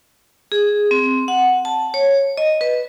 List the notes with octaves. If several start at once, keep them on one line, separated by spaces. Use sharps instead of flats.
G#4
C4
F#5
A5
C#5
D#5
B4